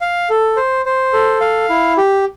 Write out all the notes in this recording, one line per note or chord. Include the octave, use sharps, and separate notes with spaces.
F5
A4
C5
C5
A4
F5
E4
G4